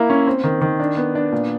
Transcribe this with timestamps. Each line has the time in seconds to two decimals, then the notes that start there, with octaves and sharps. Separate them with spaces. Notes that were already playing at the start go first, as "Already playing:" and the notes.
Already playing: A#3 E4
0.10 C#4
0.27 C4
0.44 D#3
0.61 D#3
0.80 D4
0.97 B3
1.15 D4
1.32 A#2